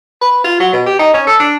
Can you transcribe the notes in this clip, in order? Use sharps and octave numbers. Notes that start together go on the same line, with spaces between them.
B4
F4
F#3
B2
G4
D#4
C#4
A4
D4